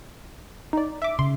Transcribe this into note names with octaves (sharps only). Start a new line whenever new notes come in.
D#4 D5
E5 D6
C#3 C6